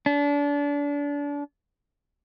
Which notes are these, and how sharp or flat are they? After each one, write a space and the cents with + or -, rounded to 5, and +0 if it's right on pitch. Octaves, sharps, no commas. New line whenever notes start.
D4 -30